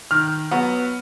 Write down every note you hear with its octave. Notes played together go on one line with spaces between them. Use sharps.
D#3 F6
F#3 B3